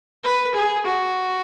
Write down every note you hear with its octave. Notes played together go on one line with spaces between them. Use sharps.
B4
G#4
F#4